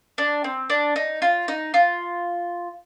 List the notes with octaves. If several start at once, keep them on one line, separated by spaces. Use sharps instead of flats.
D4
C4
D4
D#4
F4
D#4
F4